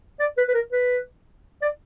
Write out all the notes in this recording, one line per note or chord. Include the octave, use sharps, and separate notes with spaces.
D5
B4
B4
A#4
B4
D5